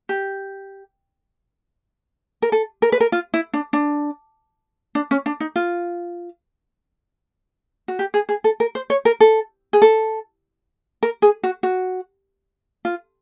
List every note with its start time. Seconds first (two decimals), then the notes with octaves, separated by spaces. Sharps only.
0.09 G4
2.42 A#4
2.52 A4
2.82 A#4
2.92 B4
3.00 A#4
3.12 F4
3.34 E4
3.54 D4
3.73 D4
4.95 D4
5.11 C#4
5.26 D4
5.40 D#4
5.56 F4
7.88 F#4
7.99 G4
8.14 G#4
8.29 G#4
8.44 A4
8.60 A#4
8.75 C5
8.90 C#5
9.05 A#4
9.20 A4
9.73 G#4
9.82 A4
11.03 A#4
11.22 G#4
11.43 F#4
11.63 F#4
12.85 F4